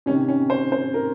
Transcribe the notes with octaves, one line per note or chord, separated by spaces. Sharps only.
C3 D#3 C#4
C#4
C5
C5
A#4